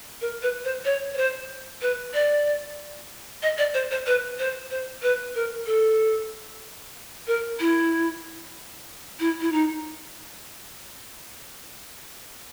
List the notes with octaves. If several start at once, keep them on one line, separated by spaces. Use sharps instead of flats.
A#4
B4
C5
C#5
C#5
C5
B4
D5
D#5
D5
C5
C5
B4
C5
C5
B4
A#4
A4
A#4
E4
E4
E4
D#4